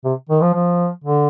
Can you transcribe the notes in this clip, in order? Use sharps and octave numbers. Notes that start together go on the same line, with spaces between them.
C3
D#3
F3
F3
D3